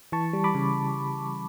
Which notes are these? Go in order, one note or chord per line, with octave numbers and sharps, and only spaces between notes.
E3 A5 C#6
G3
B5 D6
C#3